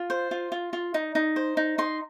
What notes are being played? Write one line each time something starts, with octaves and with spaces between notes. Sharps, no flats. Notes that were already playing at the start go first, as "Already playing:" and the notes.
Already playing: F4
C5
F4
F4
F4
D#4
D#4
C5
D#4
D#4 C6